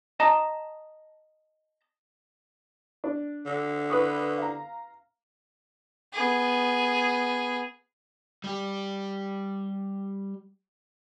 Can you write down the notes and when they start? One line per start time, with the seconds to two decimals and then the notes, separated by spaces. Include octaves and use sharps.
0.20 D#5 A5 A#5
3.04 D4
3.46 D3
3.90 B4 C#6 D#6
4.38 F5 A#5
6.13 B3 G#4
8.44 G3 G4